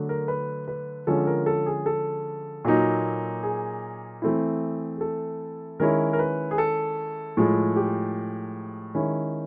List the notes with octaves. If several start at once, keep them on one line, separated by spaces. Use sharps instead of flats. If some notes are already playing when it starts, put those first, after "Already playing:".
Already playing: D3 F#3 A3 D4
A#4
B4
B4
D3 F3 G#3 C#4 A4
A#4
A4
G#4
A4
A#2 F#3 A#3 D#4
G#4
E3 A3 C4 E4
G#4
A4
D#3 G#3 C#4 E4 A#4
A#4
B4
G#4
A4
A2 F3 G#3
G4
D#3 G#3 C#4 E4